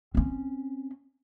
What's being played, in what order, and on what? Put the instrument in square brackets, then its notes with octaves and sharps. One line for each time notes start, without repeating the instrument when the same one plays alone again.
[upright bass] C4 C#4